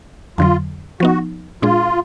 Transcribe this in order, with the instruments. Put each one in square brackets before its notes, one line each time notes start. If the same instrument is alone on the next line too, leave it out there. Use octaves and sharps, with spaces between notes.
[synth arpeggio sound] F2 D3 F#3 [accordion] F4
[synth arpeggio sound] F3 B3 D#4 [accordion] F#4
[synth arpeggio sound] A#2 G#3 D4 G#4 [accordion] F4